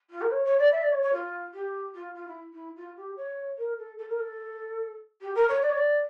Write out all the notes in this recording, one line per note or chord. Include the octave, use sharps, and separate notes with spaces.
F4
A#4
C#5
C#5
D5
E5
D5
C#5
C#5
F4
G4
F4
F4
E4
E4
F4
G4
C#5
A#4
A4
A4
A#4
A4
G4
A#4
C#5
D5
C#5
D5